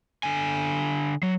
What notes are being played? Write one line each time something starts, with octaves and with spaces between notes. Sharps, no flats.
D3 G#5
F#3